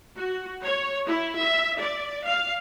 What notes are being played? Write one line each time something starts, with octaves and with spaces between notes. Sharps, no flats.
F#4
C#5
E4
E5
D5
F5